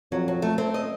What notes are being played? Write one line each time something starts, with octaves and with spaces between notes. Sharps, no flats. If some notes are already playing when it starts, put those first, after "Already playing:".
F2 F#3
F#3
A3
C4
D#5